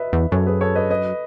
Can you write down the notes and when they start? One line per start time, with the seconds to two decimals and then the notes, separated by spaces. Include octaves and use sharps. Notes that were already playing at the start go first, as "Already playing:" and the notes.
Already playing: B4 D#5 E5
0.13 E2
0.31 F#2 A4 C#5
0.46 G#4 B4
0.61 A4 C#5
0.75 B4 D#5
0.90 B4 D#5